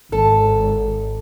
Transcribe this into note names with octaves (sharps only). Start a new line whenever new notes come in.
G#1 A4